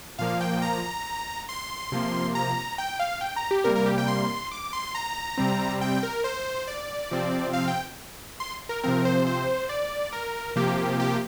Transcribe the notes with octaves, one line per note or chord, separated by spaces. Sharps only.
A#2 F3 A#3 F5
G5
A#5
C6
C3 F3 A#3
A#5
G5
F5
G5
A#5
G4
C3 G3 A#3 A#4
A#4
G4
G5
C6
D6
C6
A#5
C3 G3 C4
G5
A#4
C5
D5
C3 F3 C4
F5
G5
C6
A#4
C3 F3 C4 A#4
C5
C5
D5
A#4
C3 F3 A#3 G4
G4